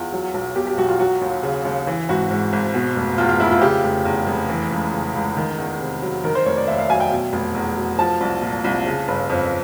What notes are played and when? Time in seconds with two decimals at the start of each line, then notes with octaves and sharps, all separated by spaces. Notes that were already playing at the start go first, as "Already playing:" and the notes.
Already playing: E2 F4
0.12 F#3
0.34 B1
0.56 B2 G4
0.67 G4
0.78 B1 F#4
0.88 F4
0.99 F#3 F#4
1.21 D#2
1.43 C#3
1.65 D#2
1.87 E3
2.09 G#1 F#4
2.31 G#2
2.53 G#1
2.74 B2
2.96 F1
3.18 E2 F4
3.29 F4
3.40 F1 E4
3.51 F4
3.62 C#3 G4
3.84 F1
4.05 E2
4.27 F1
4.49 E3
4.71 C#2
4.93 C#3
5.15 C#2
5.37 D#3
5.58 E2
5.80 C3
6.02 F#3
6.24 D#3 A#4
6.35 C5
6.46 F1 C#5
6.57 D5
6.67 D#2 E5
6.78 F5
6.89 F#3 G#5
7.00 G5
7.11 B2
7.33 F1
7.55 E2
7.77 F#3
7.98 F3 A5
8.20 C2
8.42 A#2
8.64 C2
8.86 C#3
9.08 G1
9.29 F2